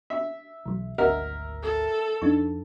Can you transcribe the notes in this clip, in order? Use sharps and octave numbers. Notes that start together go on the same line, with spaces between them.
E5
B1 E3 F#3
G#1 D2 A#4 D#5 E5 F#5 E6
A4
F2 D4 D#4 C#6